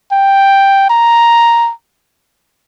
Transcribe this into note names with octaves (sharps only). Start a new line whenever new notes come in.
G5
A#5